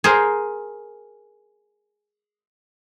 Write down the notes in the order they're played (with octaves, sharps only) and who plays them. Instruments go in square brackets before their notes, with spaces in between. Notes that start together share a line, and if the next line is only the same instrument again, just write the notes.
[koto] G#4 A#4 C5